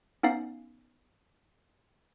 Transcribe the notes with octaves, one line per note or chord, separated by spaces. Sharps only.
B3 C#4 D#4 F5